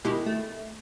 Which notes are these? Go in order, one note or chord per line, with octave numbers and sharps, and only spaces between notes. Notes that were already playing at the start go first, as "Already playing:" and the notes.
B2 D#3 G#3 E4 G4
A3